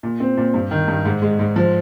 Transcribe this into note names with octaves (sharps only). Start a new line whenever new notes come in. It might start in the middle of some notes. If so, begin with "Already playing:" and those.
A#2
C4
A#2
G2
D#3
G2
G#2
G#3
G#2
F3